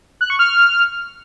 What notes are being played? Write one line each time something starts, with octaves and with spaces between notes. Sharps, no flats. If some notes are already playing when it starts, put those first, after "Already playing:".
F#6
C#6
F6